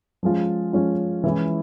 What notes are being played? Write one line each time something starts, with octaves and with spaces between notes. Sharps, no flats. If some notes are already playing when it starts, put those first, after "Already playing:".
F3 G#3 C#4 F4
F3 G#3 C#4 F4
E3 G#3 C#4 E4